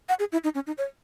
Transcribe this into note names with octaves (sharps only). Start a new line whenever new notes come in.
F#5
G#4
E4
D#4
C#4
D#4
C#5